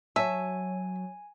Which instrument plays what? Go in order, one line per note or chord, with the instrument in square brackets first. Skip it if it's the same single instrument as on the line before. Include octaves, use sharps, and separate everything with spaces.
[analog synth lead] F#3 [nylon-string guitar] C#5 A5 [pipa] E5 [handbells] G#5